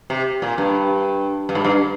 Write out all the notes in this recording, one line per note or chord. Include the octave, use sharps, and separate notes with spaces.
C3
A#2
G2
G2
G#2
G2